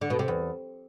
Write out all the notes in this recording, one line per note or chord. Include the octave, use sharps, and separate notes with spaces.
D3
B2
C3
E2